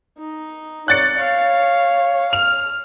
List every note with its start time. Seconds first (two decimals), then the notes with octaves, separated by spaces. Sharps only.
0.18 D#4
0.88 C#5 D5 F#6 A6 C#7
1.18 C#5 F5
2.33 F6 F7